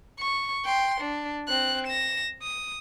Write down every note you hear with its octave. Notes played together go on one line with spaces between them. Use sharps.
C#6
G5 C6
D4
C4 F#6
A#6 E7
D#6